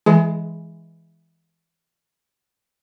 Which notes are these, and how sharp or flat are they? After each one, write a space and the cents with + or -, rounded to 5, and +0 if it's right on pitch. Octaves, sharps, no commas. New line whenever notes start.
E3 +0 G#3 +0 G#4 +40